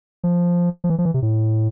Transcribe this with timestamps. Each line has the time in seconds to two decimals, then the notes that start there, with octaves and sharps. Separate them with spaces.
0.24 F3
0.84 F3
0.90 E3
0.98 F3
1.05 E3
1.14 C3
1.22 A2